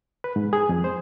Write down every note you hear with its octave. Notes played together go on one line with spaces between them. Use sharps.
B4
G#2
G#4
F2
C5